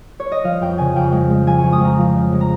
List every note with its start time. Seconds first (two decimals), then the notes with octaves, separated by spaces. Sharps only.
0.20 C#5
0.32 D#5
0.44 F3 F5
0.61 F2 G5
0.78 C#3 G#5
0.96 F2 G5
1.12 G#3
1.30 G#3
1.47 F3 G#5
1.59 F2 C#6
1.72 D#6
1.81 F2 A#5
1.98 F3
2.15 C#3
2.33 G#3
2.41 A#5